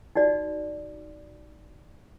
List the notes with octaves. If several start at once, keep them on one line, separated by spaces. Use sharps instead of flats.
D#4 F#4 D5